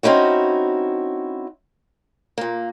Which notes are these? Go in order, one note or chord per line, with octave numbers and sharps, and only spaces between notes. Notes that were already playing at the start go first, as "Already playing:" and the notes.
C4 C#4 D#4 E4 F#4
A#2 A#3